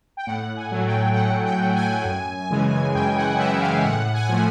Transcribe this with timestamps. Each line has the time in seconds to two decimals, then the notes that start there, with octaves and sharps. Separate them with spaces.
0.17 G5
0.26 A2 F#5
0.57 G#5
0.72 F#3 A3
0.87 G5
1.12 G5
1.16 A2 F#5
1.46 G5
1.60 F#3 A3
1.76 G#5
2.05 F#2
2.51 C#3 E3 G#3
2.94 F#2 G5
3.17 F#5
3.39 C#3 E3 G#3 E5
3.61 F5
3.83 A2 F#5
4.14 G#5
4.29 F3 A3